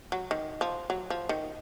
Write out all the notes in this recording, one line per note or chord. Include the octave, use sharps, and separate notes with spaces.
F#3
D#3
F3
F#3
F3
D#3